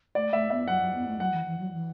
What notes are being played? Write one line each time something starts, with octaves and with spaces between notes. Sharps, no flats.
A3 D5
A3 E5
B3 E5
F#3 F#5
F#3
B3
A3
F#3 F#5
E3
E3
F#3
E3